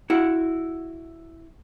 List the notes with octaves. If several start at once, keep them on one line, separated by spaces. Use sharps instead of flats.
E4 F#4 F#5